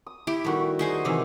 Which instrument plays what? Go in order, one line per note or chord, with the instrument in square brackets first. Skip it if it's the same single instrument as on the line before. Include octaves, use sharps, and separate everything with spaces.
[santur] D#6
[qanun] E4 G4
[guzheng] D#3 G3 [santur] A3 B3 F#4
[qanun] D#4 G#4 C5
[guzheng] C3 D#3 E3 [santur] D5 E5 G#5